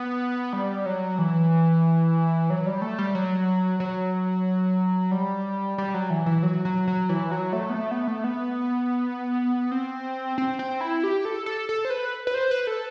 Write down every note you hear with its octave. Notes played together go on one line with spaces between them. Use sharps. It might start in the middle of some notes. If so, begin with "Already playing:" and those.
Already playing: B3
G3
F#3
E3
F#3
G3
A3
G3
F#3
F#3
G3
G3
F#3
E3
E3
F#3
F#3
F#3
E3
F#3
A3
B3
A3
B3
A3
B3
C4
C4
C4
E4
G4
A4
A4
A4
C5
B4
B4
C5
B4
A4